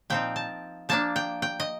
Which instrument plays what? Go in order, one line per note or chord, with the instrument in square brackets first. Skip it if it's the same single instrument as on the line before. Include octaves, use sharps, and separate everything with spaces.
[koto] A#2 F3 C4 D#4 G5
A5
F3 A#3 D4 A5
G5
G5
D#5